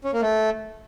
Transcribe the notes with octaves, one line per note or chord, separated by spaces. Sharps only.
C#4
A#3
A3